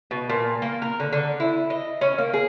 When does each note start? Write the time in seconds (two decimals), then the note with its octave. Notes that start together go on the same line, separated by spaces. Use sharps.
0.11 B2
0.29 A#2
0.62 A#3
0.82 A#4
1.00 D3
1.13 D3
1.40 E4
1.70 D#5
2.01 C#4
2.18 A#3
2.33 G#4